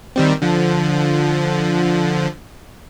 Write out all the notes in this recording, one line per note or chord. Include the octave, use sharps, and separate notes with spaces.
D#3 G3 C4
D3 F3